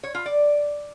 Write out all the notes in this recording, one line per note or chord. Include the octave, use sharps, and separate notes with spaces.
C#5
F4
D5